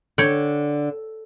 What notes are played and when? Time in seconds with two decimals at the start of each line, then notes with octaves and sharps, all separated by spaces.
0.18 D3 C#5 G5